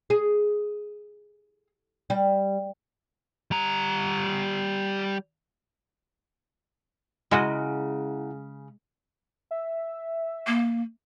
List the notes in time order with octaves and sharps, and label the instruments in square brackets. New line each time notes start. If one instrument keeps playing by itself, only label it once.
[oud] G#4
G3
[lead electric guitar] G3 A#5
[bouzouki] C#3 [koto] G#3 F#4 D#5 [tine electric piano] E4 F#5 A#5
[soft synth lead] E5
[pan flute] A#3